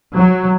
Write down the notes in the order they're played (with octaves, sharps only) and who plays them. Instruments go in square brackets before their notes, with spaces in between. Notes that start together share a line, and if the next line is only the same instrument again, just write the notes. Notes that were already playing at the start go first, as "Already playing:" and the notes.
[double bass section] F#3